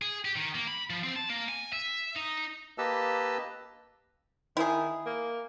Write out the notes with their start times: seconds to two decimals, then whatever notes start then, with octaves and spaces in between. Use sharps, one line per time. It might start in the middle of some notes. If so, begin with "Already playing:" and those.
0.02 G#4
0.25 G4
0.36 D#3
0.55 A#3
0.68 B5
0.90 F3
1.03 C4
1.16 A5
1.30 A#3
1.49 G#5
1.73 E5
2.16 D#4
2.78 A#3 G4 B4 D#5 A5 E6
4.57 D#3 E4 G#4
5.06 A#3